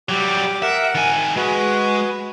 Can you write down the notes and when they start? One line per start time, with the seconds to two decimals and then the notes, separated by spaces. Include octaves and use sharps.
0.09 F#3 G3 G4 D6
0.62 A#4 E5 F#5
0.95 D#3 G#5
1.36 G#3 F#4 B4